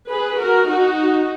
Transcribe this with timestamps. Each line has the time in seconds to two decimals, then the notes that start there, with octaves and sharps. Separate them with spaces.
0.08 G#4 B4
0.37 F#4 A#4
0.67 D#4 F#4